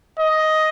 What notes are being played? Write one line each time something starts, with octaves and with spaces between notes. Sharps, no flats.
D#5